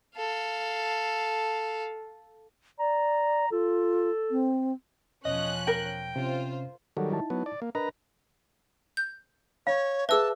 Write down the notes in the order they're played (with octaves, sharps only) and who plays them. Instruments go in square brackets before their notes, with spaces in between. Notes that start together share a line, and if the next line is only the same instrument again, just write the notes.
[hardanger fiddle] A4 F5
[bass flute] D5 [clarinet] A#5
[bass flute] F4 [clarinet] A4
[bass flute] C4
[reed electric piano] E2 B2 [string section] F3 C#4 F#6 [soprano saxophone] D#5
[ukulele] A#4 [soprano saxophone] G5
[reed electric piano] C3 C#4 [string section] F4 C5
[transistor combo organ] D#3 F#3 G3 [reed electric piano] A4 F#5
[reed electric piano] D#4 E4 A5
[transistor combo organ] F#3 B3
D5
A#3
[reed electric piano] D4 A#4 D#5 [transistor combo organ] B4 A#5
[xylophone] G6
[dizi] C#5 [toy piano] F5
[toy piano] G#4 E5 [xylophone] B4 E6 [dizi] A5